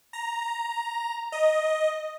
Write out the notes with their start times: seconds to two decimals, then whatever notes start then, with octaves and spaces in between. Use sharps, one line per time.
0.13 A#5
1.32 D#5